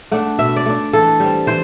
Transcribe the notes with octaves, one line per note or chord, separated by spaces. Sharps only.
A3 D4 F#5
B2 E5
D5
A3 D4
E3 A4
G3 C4
E3 C5